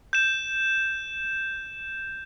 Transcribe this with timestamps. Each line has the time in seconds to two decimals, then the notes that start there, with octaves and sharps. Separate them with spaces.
0.13 G6 E7